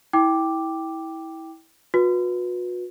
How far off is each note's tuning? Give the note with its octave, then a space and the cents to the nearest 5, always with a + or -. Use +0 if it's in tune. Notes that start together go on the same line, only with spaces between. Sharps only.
E4 -20 G5 +0 D6 +0
F#4 -40 B4 -15